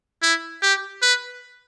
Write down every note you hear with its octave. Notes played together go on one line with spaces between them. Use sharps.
E4
G4
B4